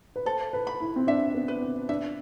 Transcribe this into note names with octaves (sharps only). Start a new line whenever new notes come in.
B4
A4 C5
B4
B5
E4
C4
D4 E5
B3
B4
C4
D4 E5